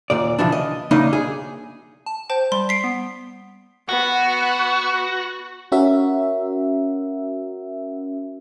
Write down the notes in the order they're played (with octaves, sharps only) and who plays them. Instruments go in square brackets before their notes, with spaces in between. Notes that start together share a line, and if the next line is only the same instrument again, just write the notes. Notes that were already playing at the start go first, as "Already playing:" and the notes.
[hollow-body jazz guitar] D#2 A#2 D5
C#3 E3 F3 D4
D#5
E2 C#3 A#3 D4 D#4 D#5
G#4
[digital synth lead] A5
[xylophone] C5 G5 A5 [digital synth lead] G6
[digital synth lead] G3 [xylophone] C6
[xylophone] B6 C7 D7
[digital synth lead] B3
[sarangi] B3 [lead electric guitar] F#4
[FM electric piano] C#4 F#4 A#4 E5